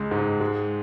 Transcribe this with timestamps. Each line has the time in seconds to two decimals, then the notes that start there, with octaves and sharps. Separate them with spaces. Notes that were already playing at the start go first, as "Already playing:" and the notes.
Already playing: C#2 G#3
0.11 G#2
0.40 G#3